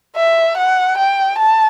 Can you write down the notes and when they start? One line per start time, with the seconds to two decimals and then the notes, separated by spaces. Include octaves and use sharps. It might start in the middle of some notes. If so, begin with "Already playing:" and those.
0.16 E5
0.57 F#5
0.97 G5
1.38 A5